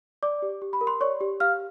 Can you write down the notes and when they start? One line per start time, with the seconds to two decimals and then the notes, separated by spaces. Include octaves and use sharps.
0.23 D5 D6
0.42 G4
0.62 G4
0.73 B5
0.81 A#4
0.87 C6
1.01 C#5 D5 C#6
1.21 G4
1.40 G4 F5 F6